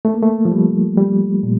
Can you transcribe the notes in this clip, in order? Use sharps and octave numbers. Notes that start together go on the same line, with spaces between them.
A3
A#3
A3
F3
G3
G3
A#2